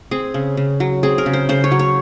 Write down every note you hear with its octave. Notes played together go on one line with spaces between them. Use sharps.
C4 G#4
C#3
C#3
F#3
C4 G#4
A#4
C#3
C5
C#3 C5
C#5
F#3
C#5